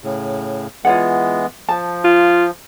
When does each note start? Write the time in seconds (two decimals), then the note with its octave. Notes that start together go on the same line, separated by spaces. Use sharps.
0.04 A2 C#3
0.85 E3 G#3 B3 F4 C#5 F#5
1.69 F3 A5
2.05 F4